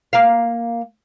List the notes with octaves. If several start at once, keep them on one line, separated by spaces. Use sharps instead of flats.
A#3 F5